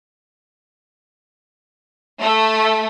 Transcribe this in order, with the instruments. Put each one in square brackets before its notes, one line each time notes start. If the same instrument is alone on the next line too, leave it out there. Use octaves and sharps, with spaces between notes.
[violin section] A3